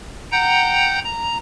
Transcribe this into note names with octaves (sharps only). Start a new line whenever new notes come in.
F#5 G5 A#5 G6
A#5